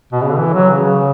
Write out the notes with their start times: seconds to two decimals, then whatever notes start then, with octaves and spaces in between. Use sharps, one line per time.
0.12 B2
0.22 C#3
0.30 D3
0.38 E3
0.54 F#3
0.70 C#3